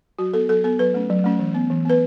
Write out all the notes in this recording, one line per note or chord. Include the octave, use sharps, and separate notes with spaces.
F#3 F#4
B3 A4
F#3 A4
B3 A4
F#3 B4
A3 C#4
F#3
A3 C#4
E3
B3
E3
B3 B4